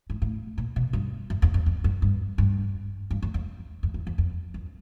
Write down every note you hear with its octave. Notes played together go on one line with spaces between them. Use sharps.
G#2
A2
A#2
B2
G2
F#2
E2
F2
F2
F#2
G2
G2
G2
F#2
F2
F2
E2
F2
F2
F#2